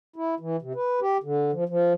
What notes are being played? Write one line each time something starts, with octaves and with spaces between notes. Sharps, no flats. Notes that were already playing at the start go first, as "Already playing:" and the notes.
E4
E3
C3
B4
G4
D3
F3
F3